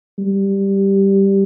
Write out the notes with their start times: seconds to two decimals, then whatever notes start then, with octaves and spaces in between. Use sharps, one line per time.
0.19 G3